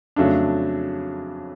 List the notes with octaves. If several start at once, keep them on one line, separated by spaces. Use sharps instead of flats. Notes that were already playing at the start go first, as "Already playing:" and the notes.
F2 C#3 F#3 A3 D4